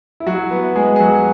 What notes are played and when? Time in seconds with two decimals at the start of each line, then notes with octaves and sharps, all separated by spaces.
0.20 E4
0.26 F#3 F#4
0.50 B3 B4
0.76 G#3 G#4
0.96 G#4
1.00 F#3 F#4